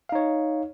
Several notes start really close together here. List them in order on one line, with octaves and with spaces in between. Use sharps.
F5 D#4 C#5